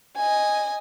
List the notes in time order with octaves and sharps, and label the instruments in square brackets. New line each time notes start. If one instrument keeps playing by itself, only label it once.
[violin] D#5 G#5